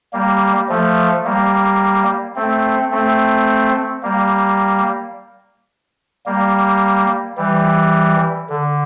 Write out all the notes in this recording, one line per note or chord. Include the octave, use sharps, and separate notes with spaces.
G3 A#3
F3 A3
G3 A#3
A3 C4
A3 C4
G3 A#3
G3 A#3
E3 G3
D3